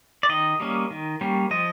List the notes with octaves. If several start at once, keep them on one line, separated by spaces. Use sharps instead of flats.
D5
D#3 D#5
G3 A#3 C#4
D#3
G3 A#3 C#4
F3 D#5